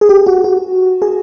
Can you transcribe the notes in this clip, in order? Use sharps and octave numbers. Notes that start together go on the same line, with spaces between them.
G#4
G4
F#4
F#4
G#4